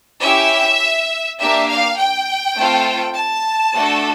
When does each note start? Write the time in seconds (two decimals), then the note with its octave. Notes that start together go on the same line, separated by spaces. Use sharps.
0.22 C#4 E4 G4 E5
1.40 A#3 D4 G4 E5
1.69 F5
1.98 G5
2.57 A3 C4 F4 A4
3.15 A5
3.74 A3 D4 F#4 A4